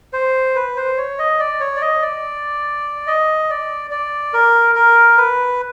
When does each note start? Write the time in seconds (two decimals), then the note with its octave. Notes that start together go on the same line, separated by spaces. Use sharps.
0.13 C5
0.55 B4
0.76 C5
0.97 C#5
1.19 D#5
1.40 D5
1.60 C#5
1.76 D5
1.82 D#5
2.02 D5
3.07 D#5
3.50 D5
3.91 D5
4.33 A#4
4.75 A#4
5.17 B4